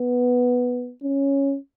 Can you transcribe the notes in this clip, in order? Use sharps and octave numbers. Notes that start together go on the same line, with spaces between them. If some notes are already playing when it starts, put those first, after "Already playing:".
Already playing: B3
C#4